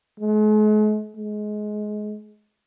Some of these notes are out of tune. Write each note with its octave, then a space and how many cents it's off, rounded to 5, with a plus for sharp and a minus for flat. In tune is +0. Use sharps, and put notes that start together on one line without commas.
G#3 +45
G#3 +20